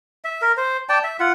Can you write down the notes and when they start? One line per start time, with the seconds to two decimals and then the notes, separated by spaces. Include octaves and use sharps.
0.25 E5
0.42 A#4
0.57 C5
0.89 D5 G5 A5
1.04 E5
1.20 F4 F#5